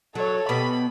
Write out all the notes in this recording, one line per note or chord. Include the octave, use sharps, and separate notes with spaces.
F#3 A4 C#5
B2 B3 G4 B5